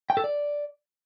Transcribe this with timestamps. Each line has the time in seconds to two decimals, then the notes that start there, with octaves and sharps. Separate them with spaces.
0.10 G5
0.17 A4
0.24 D5